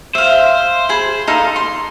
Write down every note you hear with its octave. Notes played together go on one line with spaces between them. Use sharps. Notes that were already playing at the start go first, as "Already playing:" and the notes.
C5 E5 F5
G#4 B5
D#4 A4 F5
C6